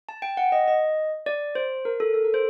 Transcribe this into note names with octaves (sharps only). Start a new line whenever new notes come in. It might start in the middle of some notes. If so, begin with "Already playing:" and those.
A5
G5
F#5
D#5
D#5
D5
C5
A#4
A4
A4
A#4
C5